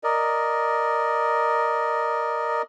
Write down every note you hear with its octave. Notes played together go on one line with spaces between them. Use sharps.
A#4 D5 D#5